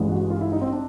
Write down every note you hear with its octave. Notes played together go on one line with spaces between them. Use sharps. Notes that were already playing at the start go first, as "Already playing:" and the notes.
Already playing: A1 G2 E3 G#3
F#4
F4
E4
D#4
C4
D4